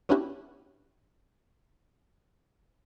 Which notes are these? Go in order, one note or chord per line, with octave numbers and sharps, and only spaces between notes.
B3 C#4 D4 E4 F#4 G4